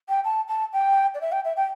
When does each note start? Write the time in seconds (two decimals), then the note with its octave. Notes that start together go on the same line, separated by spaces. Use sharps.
0.09 G5
0.24 A5
0.48 A5
0.73 G5
1.15 D5
1.21 E5
1.32 G5
1.45 E5
1.57 G5